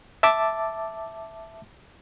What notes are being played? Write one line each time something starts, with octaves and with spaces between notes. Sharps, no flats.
E5 A5 D6 A6